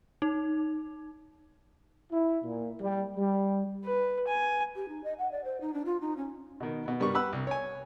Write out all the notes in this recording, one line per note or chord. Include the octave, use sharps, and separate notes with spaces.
D#4
E4
A#2
G3
G3
B4
G#5
G4
D#4
D#5
F#5
D5
C5
D#4
D4
F4
D#4
C#4
B2 D#3
B2 B3
G2 G3 A#4 C#6
G4 B4 F#5 B5 E6 F#6
C2
C#5 G#5